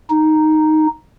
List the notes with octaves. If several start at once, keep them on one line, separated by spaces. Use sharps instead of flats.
D#4